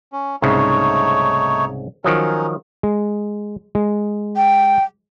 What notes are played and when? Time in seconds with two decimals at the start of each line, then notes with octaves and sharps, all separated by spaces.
0.13 C#4
0.42 C2 G#2 C#3 A3 D#4 C#5
2.04 D#3 F3 F#3 C#4 A#4
2.83 G#3
3.75 G#3
4.37 G5